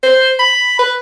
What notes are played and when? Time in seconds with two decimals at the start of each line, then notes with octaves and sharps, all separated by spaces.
0.03 C5
0.39 B5
0.79 B4